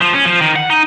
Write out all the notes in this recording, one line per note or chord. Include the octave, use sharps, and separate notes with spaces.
F3
C#4
F3
D#3
F#5
D#4